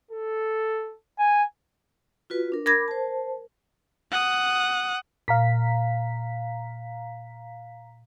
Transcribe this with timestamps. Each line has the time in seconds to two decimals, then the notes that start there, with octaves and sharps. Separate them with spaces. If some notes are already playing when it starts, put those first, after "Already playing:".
0.11 A4
1.18 G#5
2.30 F4 F#4 B4
2.52 D4 A#4
2.66 A#4 B5 D6 G#6 A#6
2.88 C5 A5
4.11 F#5 D#6
5.28 A#2 F5 A#5 B6